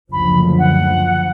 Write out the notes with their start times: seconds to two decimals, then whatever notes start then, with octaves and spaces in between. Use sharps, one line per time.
0.12 F#1 D2 F3 B5
0.59 F#5